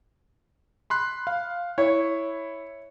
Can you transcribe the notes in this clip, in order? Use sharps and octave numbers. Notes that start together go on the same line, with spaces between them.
B5 C6 F#6
F5
E4 C#5